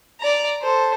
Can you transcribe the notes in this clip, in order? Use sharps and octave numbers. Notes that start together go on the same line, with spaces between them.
D5 A#5
A4 C5